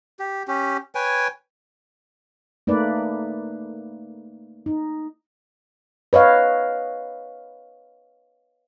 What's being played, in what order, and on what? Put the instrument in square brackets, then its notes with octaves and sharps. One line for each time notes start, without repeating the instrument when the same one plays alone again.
[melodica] G4
C#4 G4
B4 C#5 G5 G#5
[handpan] A3 A#3 D#4 B4 D5
D#4
B4 C#5 D#5 F5